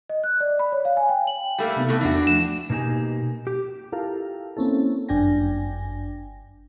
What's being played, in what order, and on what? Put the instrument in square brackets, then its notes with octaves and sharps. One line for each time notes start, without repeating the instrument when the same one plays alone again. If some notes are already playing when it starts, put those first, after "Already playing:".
[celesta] D#5
F#6
D5
B5
C#5
F5
G#5
G5
F#7
[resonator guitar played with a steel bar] G3 A3 A#3 [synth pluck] F#5 B5
[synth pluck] C3 B3 D#4
[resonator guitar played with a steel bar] A2 A3 [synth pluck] F#6
[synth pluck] E2 G5 [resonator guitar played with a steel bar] E3 D4 F#4
[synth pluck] F#6 C7 D7
[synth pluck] F3 A3 [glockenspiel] E7
[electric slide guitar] B2 A#3 D#4 G4 G#5
G4
[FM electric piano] E4 F4 G4 A4 A#4 F5
A#3 C4 C#4 E4 A4
G1 F#2 D4 G5 G#5 A#6